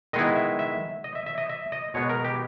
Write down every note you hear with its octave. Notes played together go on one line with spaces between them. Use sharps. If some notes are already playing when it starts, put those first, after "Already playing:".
D#3 G#3 B3 E4 D#5
E5
E5
D#5
E5
E5
D#5
E5
D#5
B2 G#3 B3 C#5
A#4
G4